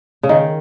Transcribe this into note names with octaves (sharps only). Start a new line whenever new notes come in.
C#3
D#3